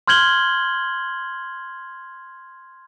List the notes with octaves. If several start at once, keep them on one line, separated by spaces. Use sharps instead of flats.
C6 F6 G6 G#6 F#7 G7